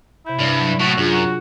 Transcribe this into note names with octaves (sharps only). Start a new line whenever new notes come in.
C3 E4 G6
G2 C#5
F#3
A2 E4 F#4
F#2 D4 F4 G#4
F#4